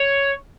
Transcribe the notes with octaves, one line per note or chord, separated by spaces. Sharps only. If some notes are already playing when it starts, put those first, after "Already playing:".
Already playing: C#5